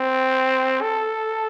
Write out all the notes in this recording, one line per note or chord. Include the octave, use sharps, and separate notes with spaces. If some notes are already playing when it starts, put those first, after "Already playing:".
Already playing: C4
A4